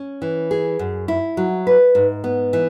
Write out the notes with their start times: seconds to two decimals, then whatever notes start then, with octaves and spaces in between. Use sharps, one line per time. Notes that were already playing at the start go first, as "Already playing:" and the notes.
Already playing: C#4
0.22 E3
0.51 G#4
0.79 F#2
1.08 E4
1.37 F#3
1.67 B4
1.95 G#2
2.24 B3
2.53 E3